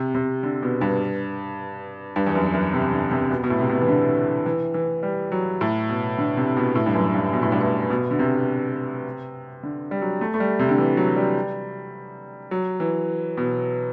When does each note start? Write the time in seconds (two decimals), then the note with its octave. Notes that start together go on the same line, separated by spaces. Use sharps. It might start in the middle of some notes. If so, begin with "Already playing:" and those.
Already playing: C3
0.15 C3
0.43 D3
0.62 B2
0.81 G2
2.16 G2
2.27 E2
2.35 F#2
2.54 F#2
2.73 C3
2.92 D3
3.11 C3
3.31 B2
3.44 B2
3.50 A2
3.60 C3
3.69 B2
3.81 E3
3.88 D3
4.46 E3
4.74 E3
5.03 G3
5.32 F#3
5.61 A2
5.89 B2
6.18 D3
6.37 C3
6.57 B2
6.75 A2
6.86 G2
6.94 F#2
7.14 G2
7.33 B2
7.43 A2
7.52 G2
7.61 A2
7.90 B2
8.11 D3
8.19 C3
9.63 D3
9.91 G3
10.02 F#3
10.21 A3
10.34 A3
10.40 G3
10.59 C3
10.69 D3
10.78 E3
10.97 F#3
11.17 G3
12.51 F#3
12.80 E3
13.37 B2